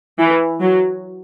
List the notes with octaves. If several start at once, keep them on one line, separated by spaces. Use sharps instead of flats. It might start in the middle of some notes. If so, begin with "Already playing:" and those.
E3
F#3